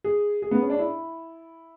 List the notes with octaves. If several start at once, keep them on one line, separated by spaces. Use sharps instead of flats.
G#4
G#4
B3
C#4
D4
E4